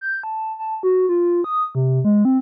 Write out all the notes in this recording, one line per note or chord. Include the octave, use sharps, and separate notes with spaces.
G6
A5
A5
F#4
F4
D#6
C3
G#3
C4